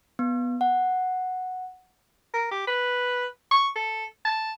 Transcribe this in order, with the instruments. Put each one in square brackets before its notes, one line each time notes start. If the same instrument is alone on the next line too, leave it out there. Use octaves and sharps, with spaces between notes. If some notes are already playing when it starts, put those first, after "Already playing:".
[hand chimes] B3
F#5
[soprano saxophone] A#4
G4
B4
C#6
A4
A5